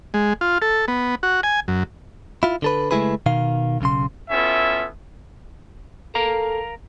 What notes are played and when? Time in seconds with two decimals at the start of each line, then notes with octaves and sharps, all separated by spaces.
0.14 G#3
0.41 F4
0.62 A4
0.88 B3
1.23 F#4
1.43 G#5
1.68 F#2
2.43 E4 F4
2.62 D3 A4 B4
2.91 C#3 G#3 A3 E4 G#4 B4
3.26 B2 D#3 F5
3.81 B1 C#3 C6
4.30 B3 C#4 E4 F4 A4 E5
6.15 A4 A#4 F5 A#5